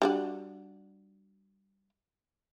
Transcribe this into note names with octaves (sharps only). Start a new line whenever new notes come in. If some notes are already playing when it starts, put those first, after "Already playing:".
G3 D4 F#4